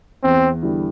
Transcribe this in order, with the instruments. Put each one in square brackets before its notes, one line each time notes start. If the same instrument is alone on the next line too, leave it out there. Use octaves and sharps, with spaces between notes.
[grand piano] E2 [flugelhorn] C4
[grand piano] D3 G3 B3 E4